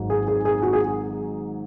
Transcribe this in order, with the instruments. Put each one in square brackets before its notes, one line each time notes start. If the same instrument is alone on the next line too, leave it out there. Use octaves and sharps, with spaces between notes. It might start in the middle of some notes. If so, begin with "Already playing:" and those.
Already playing: [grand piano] G#1 G#2 F#3
G#4
G#4
G#4
F#4
G#4